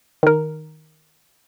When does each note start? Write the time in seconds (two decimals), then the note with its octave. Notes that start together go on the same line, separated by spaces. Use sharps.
0.23 D#3 A#4